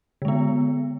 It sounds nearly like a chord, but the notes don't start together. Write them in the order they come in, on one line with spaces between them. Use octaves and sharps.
D3 G#3 B3